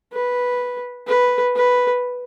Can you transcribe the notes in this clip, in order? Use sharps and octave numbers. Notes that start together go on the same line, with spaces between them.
B4
B4
B4